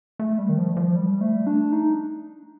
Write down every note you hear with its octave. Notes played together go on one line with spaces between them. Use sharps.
A3
G3
D#3
F3
F3
G3
A3
D4
D#4